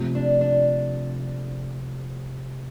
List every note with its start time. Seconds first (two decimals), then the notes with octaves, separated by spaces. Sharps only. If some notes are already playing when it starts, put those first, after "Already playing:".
Already playing: C3 F3 A3
0.15 D4
0.41 D4